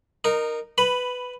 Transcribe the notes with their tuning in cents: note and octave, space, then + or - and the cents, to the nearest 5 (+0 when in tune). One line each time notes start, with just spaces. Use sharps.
D#4 -20 A#4 +0
B4 +10 B5 +0